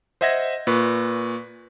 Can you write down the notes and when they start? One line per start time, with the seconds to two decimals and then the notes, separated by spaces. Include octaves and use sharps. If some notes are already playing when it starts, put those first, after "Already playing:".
0.21 C5 D#5 E5 F#5 G#6 A#6
0.67 A#2 B4 C#6